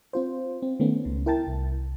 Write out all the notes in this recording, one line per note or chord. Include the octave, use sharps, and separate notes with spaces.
C4 F4 C5
C4
D#3 A3 B3 C#4
C#2 C#3
E4 A#4 G5 A5 A6
C2